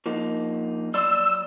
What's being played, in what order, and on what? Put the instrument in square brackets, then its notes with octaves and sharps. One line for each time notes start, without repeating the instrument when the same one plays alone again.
[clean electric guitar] F3 A#3 D#4
[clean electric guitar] F#3 D5 C6 [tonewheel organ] E6